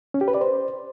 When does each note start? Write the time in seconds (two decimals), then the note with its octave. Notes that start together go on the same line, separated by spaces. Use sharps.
0.14 C#4
0.21 G4
0.28 B4
0.34 D5
0.41 C5